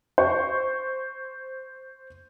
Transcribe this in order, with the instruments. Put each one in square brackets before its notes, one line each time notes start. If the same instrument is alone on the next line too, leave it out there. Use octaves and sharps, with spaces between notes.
[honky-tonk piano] C5 C#6